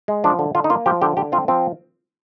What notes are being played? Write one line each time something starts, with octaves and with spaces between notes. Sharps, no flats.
G#3
F3 D4
D3
D3 F4
D#4
A#3 F4
F3 G4
D3 G4
D3 G4
C4 F4
F3 C4